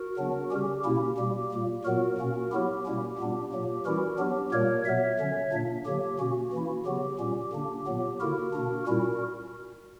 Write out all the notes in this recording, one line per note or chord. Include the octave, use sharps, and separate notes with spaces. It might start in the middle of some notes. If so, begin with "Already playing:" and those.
Already playing: F#4 A#4
C#3 F#3 B3 D4
C#3 G3 C#4 G4
B2 A#3 C#4 E4 G4
B2 G3 A#3
A#2 G3 A#3
A#2 F#3 B3 F#4 A#4
B2 A#3 C#4
F#3 B3 E4 G4
B2 G3 A#3 C#4 E4
A#2 G3 B3 D4
A#2 F#3 A#3
E3 G3 C#4 E4 F#4 A#4
F#3 B3 D4 G4
A#2 G3 A#3 A#4 C#5
B2 F#3 B3 C#5 E5
D3 F#3 C#4
A#2 A#3 D4
D3 F#3 A#3 G4
B2 A#3 C#4 F#4
E3 A#3 C#4 E4
C#3 F#3 B3 G4
A#2 G3 C#4
D3 A#3 D4
A#2 F#3 B3
D3 A#3 E4 F#4 A#4
B2 A#3 D4
A#2 G3 C#4 E4 F#4 A#4